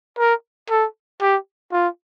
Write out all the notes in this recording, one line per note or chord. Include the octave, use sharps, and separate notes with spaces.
A#4
A4
G4
F4